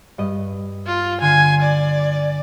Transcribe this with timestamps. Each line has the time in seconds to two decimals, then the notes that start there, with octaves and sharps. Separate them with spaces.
0.18 G2 D#5
0.87 F4
1.21 D3 G#5 C7
1.63 D5